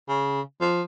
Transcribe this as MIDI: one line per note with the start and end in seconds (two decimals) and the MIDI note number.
0.09 0.41 49
0.61 0.83 53